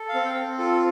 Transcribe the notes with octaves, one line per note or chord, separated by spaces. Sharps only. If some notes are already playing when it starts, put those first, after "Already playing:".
Already playing: A4
F5
C4
G5
C4
F4 A4